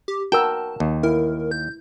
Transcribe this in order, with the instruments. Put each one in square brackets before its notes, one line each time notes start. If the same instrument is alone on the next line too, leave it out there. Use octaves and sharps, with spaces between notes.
[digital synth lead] G4
[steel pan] F#4 A#4 E6 [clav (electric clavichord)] G5 [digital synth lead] A5
[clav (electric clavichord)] D#2
[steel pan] E4 [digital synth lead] A#4
[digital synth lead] G6